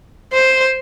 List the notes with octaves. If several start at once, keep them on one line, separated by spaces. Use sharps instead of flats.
C5